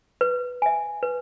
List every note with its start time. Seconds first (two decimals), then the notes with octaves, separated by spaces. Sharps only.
0.21 B4
0.62 E5 G#5
1.03 B4